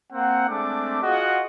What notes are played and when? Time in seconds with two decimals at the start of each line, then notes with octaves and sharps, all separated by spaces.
0.13 A#3 C4 F#5
0.49 G#3 A3 C4 D4 D6
1.03 F4 F#4 G#4 D#5 F#5